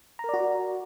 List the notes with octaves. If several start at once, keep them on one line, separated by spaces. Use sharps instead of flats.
F#4 A#4 D5 A#5